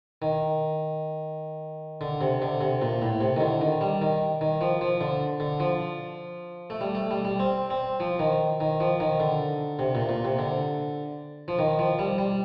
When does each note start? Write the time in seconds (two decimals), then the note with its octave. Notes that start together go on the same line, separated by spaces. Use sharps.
0.22 D#3
2.01 D3
2.21 C3
2.42 D3
2.61 C3
2.82 A#2
3.02 A2
3.21 C3
3.36 D#3
3.40 D3
3.61 D#3
3.81 G3
4.01 D#3
4.41 D#3
4.61 F3
4.81 F3
5.01 D3
5.40 D3
5.60 F3
6.70 A3
6.81 G3
6.95 A3
7.11 G3
7.25 G3
7.39 C4
7.70 C4
8.00 F3
8.19 D#3
8.60 D#3
8.80 F3
9.00 D#3
9.20 D3
9.79 C3
9.95 A#2
10.09 A#2
10.25 C3
10.39 D3
11.48 F3
11.59 D#3
11.79 F3
11.99 G3
12.18 G3